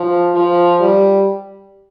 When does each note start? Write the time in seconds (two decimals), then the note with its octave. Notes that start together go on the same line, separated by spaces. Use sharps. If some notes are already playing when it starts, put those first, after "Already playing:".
Already playing: F3
0.35 F3
0.80 G3